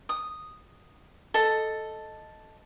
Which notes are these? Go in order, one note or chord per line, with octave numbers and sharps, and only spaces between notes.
D#6
A4 D#5